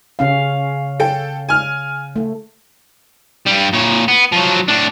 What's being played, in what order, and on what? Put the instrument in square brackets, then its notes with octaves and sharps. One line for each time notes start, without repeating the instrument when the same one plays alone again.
[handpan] C#3 C#4 F5
[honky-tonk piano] A4 G5
G#5 F6
[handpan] A3
[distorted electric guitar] G2 G3
A#2 C#5
B3
F3 F#3
A2 D4